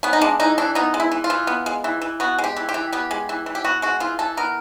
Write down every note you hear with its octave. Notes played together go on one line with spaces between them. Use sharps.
B3 C#4
D#4
G#3 D4
E3 D#4
E3 D4
B3 D#4
G#3
E4
E3
F4
E3
B3
G#3
E3
E3
B3 F#4
G#3
G4
E3
G4
E3
B3 G4
G#3
E3
E3
G4
B3 F#4
G#3 F#4
E3 F4
E3 A4
B3 A#4